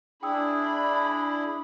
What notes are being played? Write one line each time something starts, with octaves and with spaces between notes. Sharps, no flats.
D4 E4 G#4 G5 B5 D#6 E6